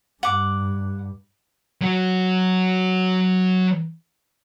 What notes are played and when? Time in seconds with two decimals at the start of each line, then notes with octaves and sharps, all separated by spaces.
0.23 G2 F#5 D6
1.81 F#3 F#4